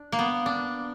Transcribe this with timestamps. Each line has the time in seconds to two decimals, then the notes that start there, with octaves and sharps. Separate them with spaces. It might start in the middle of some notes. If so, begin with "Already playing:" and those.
Already playing: D4
0.12 A#3
0.19 B3
0.46 D4